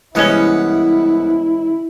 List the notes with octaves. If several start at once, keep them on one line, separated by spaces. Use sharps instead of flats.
C2 E3 G#3 B3 C#4 E4 F#5